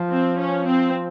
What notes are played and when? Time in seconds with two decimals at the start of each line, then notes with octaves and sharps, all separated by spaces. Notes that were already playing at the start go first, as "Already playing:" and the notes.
Already playing: F3
0.10 C4
0.39 C#4
0.67 C4